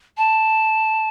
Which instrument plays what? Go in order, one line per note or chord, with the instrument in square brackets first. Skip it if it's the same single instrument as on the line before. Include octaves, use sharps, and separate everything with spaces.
[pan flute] A5